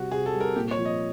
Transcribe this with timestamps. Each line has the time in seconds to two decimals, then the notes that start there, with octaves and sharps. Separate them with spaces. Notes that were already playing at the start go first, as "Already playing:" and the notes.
Already playing: C3 G3 F#4
0.11 C3 G#4
0.26 A4
0.34 G3
0.40 A#4
0.56 A#2 G4
0.71 C#5
0.78 F3
0.85 D#5